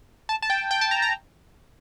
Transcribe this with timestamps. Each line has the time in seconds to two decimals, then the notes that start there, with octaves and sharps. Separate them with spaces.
0.29 A5
0.42 A5
0.50 G5
0.71 G5
0.81 A5
0.91 A#5
1.02 A#5